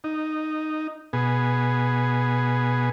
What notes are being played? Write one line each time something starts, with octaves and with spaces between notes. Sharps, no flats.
D#4
B2 B3 G#4